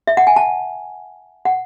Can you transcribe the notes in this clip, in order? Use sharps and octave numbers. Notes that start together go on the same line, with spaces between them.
E5
F#5
G#5
A5
F#5